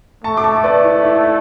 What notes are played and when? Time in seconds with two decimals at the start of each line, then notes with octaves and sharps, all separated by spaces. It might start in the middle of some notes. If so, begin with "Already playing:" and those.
0.24 A3 A5 C#6
0.37 D6
0.44 A5 C#6
0.64 B4 D5
0.83 E4
1.04 E4